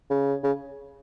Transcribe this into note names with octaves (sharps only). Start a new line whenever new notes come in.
C#3
C#3